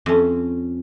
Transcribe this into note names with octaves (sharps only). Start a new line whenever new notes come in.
F2 C#4